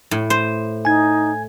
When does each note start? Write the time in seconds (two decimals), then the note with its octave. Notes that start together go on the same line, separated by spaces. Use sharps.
0.11 A2
0.30 C5
0.85 D#4 G#5 G#6